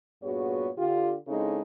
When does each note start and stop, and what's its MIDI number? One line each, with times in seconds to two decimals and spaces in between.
0.23 0.69 43
0.23 0.69 46
0.23 0.69 59
0.23 0.69 66
0.23 0.69 68
0.23 0.69 73
0.78 1.14 50
0.78 1.14 65
0.78 1.14 67
1.28 1.62 49
1.28 1.62 56
1.28 1.62 60
1.28 1.62 63
1.28 1.62 64
1.28 1.62 69